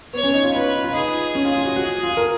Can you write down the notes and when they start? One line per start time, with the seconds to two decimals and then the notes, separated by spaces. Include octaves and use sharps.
0.13 B3 C#5
0.23 C#4
0.34 D#4
0.44 F4
0.54 F4 B4
0.75 D#4
0.84 F4
0.93 D#4 G#4
1.35 C#4
1.45 F4
1.55 F4
1.65 F#4
1.76 F#4
2.03 F4
2.17 A#4